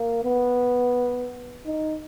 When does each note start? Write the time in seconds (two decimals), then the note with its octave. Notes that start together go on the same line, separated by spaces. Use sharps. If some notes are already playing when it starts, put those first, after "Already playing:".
Already playing: A#3
0.24 B3
1.66 D#4